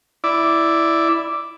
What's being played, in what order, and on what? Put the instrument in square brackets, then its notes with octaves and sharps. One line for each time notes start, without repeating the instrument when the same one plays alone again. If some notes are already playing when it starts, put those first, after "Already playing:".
[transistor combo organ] E4 D5